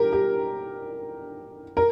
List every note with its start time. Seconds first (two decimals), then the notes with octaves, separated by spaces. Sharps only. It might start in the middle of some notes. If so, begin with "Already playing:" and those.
Already playing: G4 A#4
0.13 G4
1.77 A#4